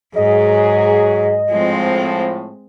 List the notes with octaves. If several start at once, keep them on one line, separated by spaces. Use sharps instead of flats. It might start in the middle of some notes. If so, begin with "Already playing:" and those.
G#2 F#3 G#4 D#5
A2 F3 G#3 C4